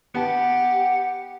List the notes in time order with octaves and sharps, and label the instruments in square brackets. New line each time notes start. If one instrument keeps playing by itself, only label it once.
[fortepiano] B3 A5 [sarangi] G4 [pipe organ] F#5